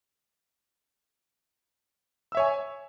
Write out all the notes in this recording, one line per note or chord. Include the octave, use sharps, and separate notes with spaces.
C#5 E5 G#5 E6